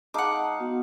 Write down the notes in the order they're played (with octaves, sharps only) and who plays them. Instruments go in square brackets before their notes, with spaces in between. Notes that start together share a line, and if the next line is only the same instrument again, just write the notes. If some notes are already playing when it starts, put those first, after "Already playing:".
[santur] G#3 D#4 F5 [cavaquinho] F#5 D6 [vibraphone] A5
[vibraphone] B3 F#4